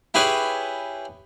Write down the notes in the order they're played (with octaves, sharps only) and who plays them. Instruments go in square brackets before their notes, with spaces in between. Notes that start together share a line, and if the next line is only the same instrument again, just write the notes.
[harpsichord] E4 G4 G#4 B4 C#5